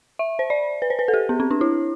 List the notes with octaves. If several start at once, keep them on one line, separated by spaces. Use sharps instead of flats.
E5
C5
D5
B4
C5
B4
A4
G4
B3
C4
D4
E4